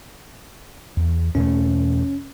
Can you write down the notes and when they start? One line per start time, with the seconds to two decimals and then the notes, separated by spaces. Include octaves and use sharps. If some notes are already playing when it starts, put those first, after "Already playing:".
0.97 E2
1.35 E2 B2 A3 C#4